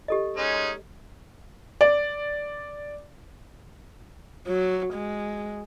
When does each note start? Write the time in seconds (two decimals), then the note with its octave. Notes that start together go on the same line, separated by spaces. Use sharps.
0.08 G4 A4 D#5
0.37 G#3 C#4 D#4
1.81 D5
4.47 F#3
4.93 G#3